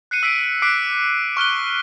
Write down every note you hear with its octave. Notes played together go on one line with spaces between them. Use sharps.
F#6 C7 C#7 D#7
E6 B6 C7 D7 D#7
D6 F#6 B6 C7 D7
C#6 F6 F#6 G7